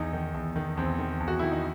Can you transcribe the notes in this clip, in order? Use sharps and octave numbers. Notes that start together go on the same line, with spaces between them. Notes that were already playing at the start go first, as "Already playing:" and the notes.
Already playing: E2 D#4
D#3
E2
D#3
E2 C4
D#3
E2
F#4
D#3 E4
D#4